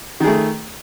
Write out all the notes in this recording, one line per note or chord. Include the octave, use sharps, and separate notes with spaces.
D#3 A3 G#4